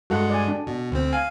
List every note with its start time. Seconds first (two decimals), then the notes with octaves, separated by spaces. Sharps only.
0.10 G2 G#3 F#4 A4 F#5
0.30 D5 G#5
0.48 D4
0.67 B2
0.91 D2 C4
1.13 F5 G#5